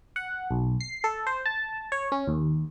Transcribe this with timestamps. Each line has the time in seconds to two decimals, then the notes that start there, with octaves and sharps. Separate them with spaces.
0.16 F#5
0.51 B1
0.81 C7
1.04 A4
1.27 C5
1.46 A5
1.92 C#5
2.12 C#4
2.27 D#2